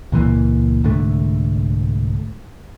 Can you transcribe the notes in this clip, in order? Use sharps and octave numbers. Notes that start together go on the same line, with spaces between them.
C#2 A#2 E3 A#3
C2 G#2 D3 A3